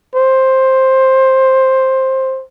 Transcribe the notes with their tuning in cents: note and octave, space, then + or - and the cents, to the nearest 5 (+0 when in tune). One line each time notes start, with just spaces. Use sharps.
C5 +10